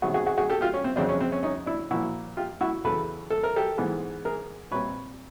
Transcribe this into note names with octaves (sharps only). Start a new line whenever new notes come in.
C3 D#3 F#3 B3 F#4 G#4
F#4 G#4
F#4 G#4
F#4 G#4
G4 A4
F4 G4
C#4
C4
F2 C#3 F#3 C4 D4
C#4
C4
C#4
C#4 D#4
D4 E4
A#2 F3 A#3 E4 F#4
F4 G4
E4 F#4
E2 C#3 F#3 A4 B4
A4
A#4
G4 A4
G#2 E3 G#3 B3
G#4 A#4
A#2 G3 C4 B4 C#5